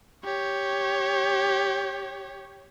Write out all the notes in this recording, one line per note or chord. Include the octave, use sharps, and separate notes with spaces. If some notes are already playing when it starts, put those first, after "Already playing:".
G4 C#5